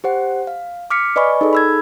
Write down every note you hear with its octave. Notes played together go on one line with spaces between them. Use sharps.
G4 C5 F#5
F5
D6 F6 B6 C#7
B4 D5 D#5 G#5 B5 C#6
D#4 G#4 A4
B5 E6 G#6